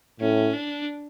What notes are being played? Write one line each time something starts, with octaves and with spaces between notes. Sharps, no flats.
A2 C#4
D4